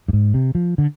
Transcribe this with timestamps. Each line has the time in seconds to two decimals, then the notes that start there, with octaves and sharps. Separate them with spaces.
0.08 G2
0.13 G#2
0.34 C3
0.55 F3
0.78 D3